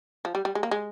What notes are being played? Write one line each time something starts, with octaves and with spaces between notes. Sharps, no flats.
F3
G3
G3
G#3
A#3
G#3